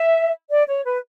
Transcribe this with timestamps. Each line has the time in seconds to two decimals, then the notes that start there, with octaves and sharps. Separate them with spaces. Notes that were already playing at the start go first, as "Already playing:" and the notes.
Already playing: E5
0.50 D5
0.68 C#5
0.85 B4